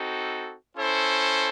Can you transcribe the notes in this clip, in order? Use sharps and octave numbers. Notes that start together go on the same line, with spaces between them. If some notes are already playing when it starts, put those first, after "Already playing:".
Already playing: C4 D#4 F#4 A4
C#4 E4 A4 C5